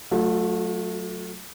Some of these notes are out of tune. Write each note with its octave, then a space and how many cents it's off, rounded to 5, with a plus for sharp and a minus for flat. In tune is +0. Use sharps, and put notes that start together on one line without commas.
F#3 +0 A3 +0 F4 +45